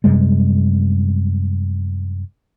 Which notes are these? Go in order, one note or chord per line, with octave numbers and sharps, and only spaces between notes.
F#2 C3 G3 G#3